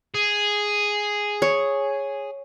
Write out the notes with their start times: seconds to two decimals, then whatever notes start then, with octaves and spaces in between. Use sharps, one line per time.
0.14 G#4
1.42 C#5